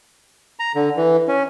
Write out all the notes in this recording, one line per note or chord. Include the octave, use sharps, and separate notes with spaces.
A#5
D3
E3
C#4